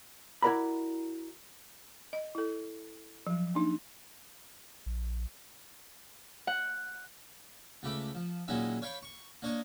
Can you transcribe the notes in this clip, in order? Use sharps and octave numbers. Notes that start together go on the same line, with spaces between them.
E4 F#4 A#4 D5 A#5 B5
D#5
E4 A4
F3 F#3
A#3 D4 D#4
A#1
F#5
C#2 A3 B5 D6
F3
A#2 D#3 F#3 G#3 C#4 E4
C#5 F5 G5 B5
C#6
A#3 D4 C#5 D#5